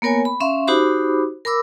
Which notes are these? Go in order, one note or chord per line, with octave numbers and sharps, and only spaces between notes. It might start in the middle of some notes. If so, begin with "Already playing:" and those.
A#3 B3 A#4 C#5 G#5
B5
C#4 E5 F5 C6
D#4 F#4 G4 C5 B5 D6
A#4 B5 D6 E6